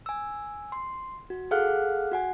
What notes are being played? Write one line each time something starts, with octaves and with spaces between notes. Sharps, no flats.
G#5 E6
C6
F#4
G#4 A4 F5 F#5 F6 F#6
F#4 F#5 G#5